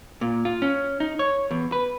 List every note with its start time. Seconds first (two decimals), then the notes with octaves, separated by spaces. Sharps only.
0.21 A#2
0.45 F4
0.62 C#4
1.00 D#4
1.19 C#5
1.51 E2
1.72 B4